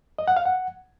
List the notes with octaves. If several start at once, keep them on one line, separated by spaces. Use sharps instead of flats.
D#5
F#5
F5
F#5